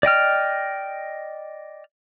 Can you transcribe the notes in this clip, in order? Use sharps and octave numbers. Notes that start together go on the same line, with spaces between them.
D5 D#5 G5 F6